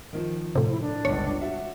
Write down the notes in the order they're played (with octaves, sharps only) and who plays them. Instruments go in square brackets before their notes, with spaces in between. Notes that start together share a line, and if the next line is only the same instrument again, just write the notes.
[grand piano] D#3 F3
[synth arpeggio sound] A2 C3
[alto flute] E4
D4
[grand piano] G1 C#2 [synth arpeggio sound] C#5
[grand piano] F#4 E5